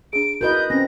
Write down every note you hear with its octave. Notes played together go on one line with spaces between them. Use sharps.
D4 G#4 D7
E4 F#4 A#4 B4 D#5 G6
C4 C#4 A#6